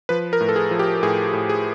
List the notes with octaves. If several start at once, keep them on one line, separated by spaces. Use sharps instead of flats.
F3 B4
A#4
A2
A4
G#4
F3
G4
A2 G#4
A2
G#4